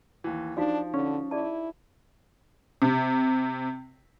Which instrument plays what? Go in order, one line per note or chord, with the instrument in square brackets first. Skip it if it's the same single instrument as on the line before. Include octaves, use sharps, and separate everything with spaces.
[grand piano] D#2 E3
[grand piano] F3 [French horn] D4 [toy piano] D#4 F#4 F5
[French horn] D3 [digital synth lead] C#4
[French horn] E4 [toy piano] G#4 D5 A5
[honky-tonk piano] C3